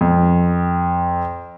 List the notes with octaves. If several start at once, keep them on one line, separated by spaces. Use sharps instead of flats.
F2